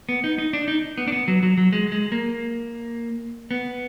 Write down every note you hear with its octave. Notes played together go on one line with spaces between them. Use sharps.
B3
D#4
D#4
D4
D#4
B3
D4
B3
F#3
F#3
F#3
G#3
G#3
A#3
B3